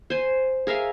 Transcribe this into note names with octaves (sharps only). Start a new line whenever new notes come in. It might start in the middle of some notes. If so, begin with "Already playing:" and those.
C5 G#5
G#4 A#4 E5 F5